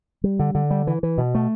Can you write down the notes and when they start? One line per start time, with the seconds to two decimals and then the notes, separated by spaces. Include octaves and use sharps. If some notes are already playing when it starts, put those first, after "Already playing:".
0.24 G3
0.39 D3
0.55 D3
0.71 G3
0.87 E3
1.03 E3
1.18 B2
1.35 A3